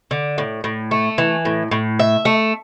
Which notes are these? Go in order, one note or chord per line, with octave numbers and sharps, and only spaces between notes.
D3
A2
A2
A3
E3
A2
A2
E5
A3